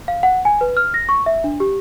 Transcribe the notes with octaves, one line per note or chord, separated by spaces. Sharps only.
F5
F#5
G#5
B4
F6
A#6
C#6
E5
D4
G4